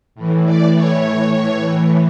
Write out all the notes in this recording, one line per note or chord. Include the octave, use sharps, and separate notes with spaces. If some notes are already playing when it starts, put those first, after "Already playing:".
A2 E3
D5
C#5